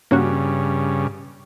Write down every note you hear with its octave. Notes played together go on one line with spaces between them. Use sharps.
G2 C#3 A#3 C#4 F#4